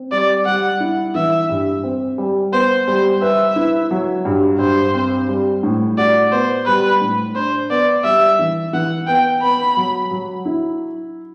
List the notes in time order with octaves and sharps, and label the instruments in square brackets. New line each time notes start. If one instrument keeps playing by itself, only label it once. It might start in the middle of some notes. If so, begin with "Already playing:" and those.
Already playing: [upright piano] C4
[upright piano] G3 [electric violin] D5
[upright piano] G3 [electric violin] F#5
[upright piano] E4
[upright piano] E3 [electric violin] E5
[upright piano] G2
C4
G3
[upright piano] B3 [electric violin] C5
[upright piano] G3 [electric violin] C5
[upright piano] B4 [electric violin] E5
[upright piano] E4
F#3
G2
[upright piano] G2 [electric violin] C5
[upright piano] C4
G3
A2
[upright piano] F#4 [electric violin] D5
[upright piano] B3 [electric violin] C5
[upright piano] G3 [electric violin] B4
[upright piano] A2
[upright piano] D4 [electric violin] C5
[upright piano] B3 [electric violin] D5
[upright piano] G3 [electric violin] E5
[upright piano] E3
[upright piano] E3 [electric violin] F#5
[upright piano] B3 [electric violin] G5
[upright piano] B3 [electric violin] B5
[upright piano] F#3
F#3
E4